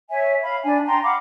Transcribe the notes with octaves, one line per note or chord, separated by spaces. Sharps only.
C#5 E5 G#5
F5 B5
D4 G#5
G5 A#5 C6
F5 F#5 B5 D6